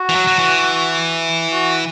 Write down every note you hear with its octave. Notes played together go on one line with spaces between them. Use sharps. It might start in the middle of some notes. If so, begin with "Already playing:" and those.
Already playing: F#4
E3
F#3
F#3
E3
F#4